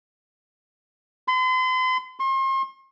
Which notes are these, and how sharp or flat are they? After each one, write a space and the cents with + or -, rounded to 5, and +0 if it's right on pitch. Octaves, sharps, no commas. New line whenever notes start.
C6 -40
C6 +40